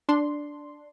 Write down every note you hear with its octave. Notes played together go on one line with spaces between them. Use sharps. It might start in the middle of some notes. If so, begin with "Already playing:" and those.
D4 C6